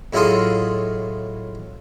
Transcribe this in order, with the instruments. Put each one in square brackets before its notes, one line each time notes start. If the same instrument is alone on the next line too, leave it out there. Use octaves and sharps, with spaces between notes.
[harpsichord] A2 F#3 G#3 F4 G#4 A4